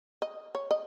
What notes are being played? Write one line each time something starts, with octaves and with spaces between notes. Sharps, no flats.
D#5
C#5
D#5